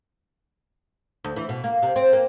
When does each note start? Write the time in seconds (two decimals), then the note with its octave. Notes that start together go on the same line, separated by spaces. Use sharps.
1.24 D2
1.36 E3
1.49 B2
1.64 A#3
1.82 C3
1.96 C4
2.13 A#3